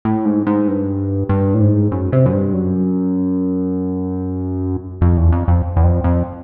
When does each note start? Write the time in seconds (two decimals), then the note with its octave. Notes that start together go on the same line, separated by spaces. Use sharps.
0.05 A2
0.25 G#2
0.47 G#2
0.68 G2
1.29 G2
1.54 A2
1.60 G#2
1.91 F#2
2.12 C3
2.26 F#2
2.33 G2
2.53 F#2
5.01 F2
5.17 E2
5.32 F2
5.48 F2
5.76 E2
5.84 F2
6.04 F2